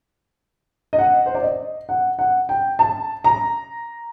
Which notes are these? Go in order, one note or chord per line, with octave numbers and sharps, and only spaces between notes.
D#5
F#5
C5
D5
D#5
F#5
F#5
G5
A5
A#5